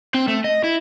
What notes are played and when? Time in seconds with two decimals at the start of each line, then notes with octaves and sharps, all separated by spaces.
0.14 C4
0.28 A3
0.44 D#5
0.64 E4